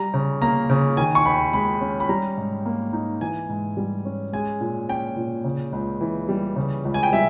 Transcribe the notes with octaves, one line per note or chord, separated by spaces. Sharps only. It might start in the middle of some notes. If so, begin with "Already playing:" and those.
Already playing: G3 A#5
C#3
A#3 A#5
C#3
D#3 G#5
C#6
D#2 B5
G#3 B5
C#4
B5
G3 A#5
G#2
A#3
D#4
E3 G#5
G#2
G3
C#4
G#3 G#5
A#2
C#4 G5
A#2
C#3
C#2
E3
G3
C#3
C#2
G#5
G5
G3 E5